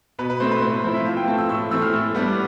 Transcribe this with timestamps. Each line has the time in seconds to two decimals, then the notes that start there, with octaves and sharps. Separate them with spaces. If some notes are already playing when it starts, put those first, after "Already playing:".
0.19 B2 B4
0.30 B4
0.40 A3 C4 C5
0.51 B4
0.62 A2 C5
0.73 B4
0.84 F3 C4 E4 C5
0.94 E5
1.06 F3 F5
1.17 G5
1.28 A3 C4 E4 A5
1.38 E6
1.49 A2 E6
1.71 E3 A3 C4 E6
1.82 F6
1.93 A2
2.15 G3 B3 D4